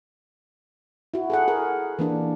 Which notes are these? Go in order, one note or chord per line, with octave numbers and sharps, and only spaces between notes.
E4 F#4
G#4 A4 F#5
G#4 A#4
E3 A#3 D4